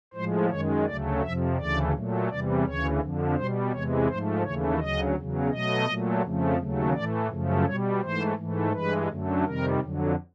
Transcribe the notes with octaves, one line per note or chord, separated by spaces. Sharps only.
A2 F3 G#3 C5
F#2 D#3 G#3 C#5
D2 C#3 F#3 A3 D5
F2 C3 F3 E5
D2 C#3 E3 A3 D5
A#2 F#3 A3
E2 C3 E3 G3 D5
D2 C#3 E3 C#5
F2 D3 F3
B2 G3 C5
E2 C3 E3 G#3 C#5
G#2 F3 A3 C5
D#2 C#3 E3 A3 C#5
D2 C#3 F#3 D#5
E2 C#3 F#3
B2 F#3 A3 D#5
A#2 F#3 A3
F2 C#3 F3 A3
D#2 C#3 F#3 A3
A2 E3 A3 D5
F#2 C#3 F3 A3
B2 G3 C#5
G#2 E3 A3 C5
G#2 E3 A3
G2 E3 G#3 B4
F#2 D3 F#3 A3
F2 C3 D#3 G3 A#4
F2 D3 F#3